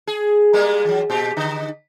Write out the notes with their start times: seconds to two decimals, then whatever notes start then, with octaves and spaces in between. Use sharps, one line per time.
0.07 G#4
0.53 G3 G#3 A#3
0.85 E3 F#3
1.10 A#2 G4
1.36 D3 D#4